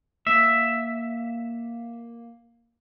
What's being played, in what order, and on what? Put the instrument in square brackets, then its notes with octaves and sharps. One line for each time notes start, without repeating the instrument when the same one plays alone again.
[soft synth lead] A#3 [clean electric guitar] E5